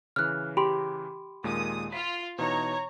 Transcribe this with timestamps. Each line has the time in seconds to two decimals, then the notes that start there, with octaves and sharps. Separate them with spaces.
0.16 C#3 E3 F6 F#6
0.57 G4 B5 C6
1.44 D#2 A#2 G#3 D#6
1.92 F4 B6
2.38 B2 E3 D#4 C#5 A#5